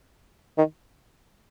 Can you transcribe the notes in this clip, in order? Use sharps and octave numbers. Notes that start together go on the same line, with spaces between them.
D#3